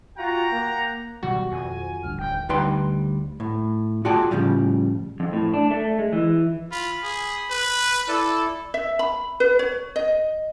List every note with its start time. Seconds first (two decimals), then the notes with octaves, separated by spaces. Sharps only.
0.17 F4 F#4 F#5 G5 A#5
0.50 A#3
1.23 B2 D#3 F#3 G3 F#4
1.52 F2 G#5
2.03 A1 D2 G2 F6
2.18 D#1 G5
2.49 D2 G3 D#4 B4 G5 C6
3.40 A2
4.05 F4 F#4 G#4 D5 G5 A5
4.31 A2 C#3 F3 G3
5.20 F2
5.33 A2
5.54 D4
5.71 A3
5.99 G#3
6.13 E3
6.71 F4 B5
7.03 G#4
7.51 B4
8.08 E4 A4 D5
8.74 E5
8.99 B5
9.40 B4
9.59 C#5
9.96 D#5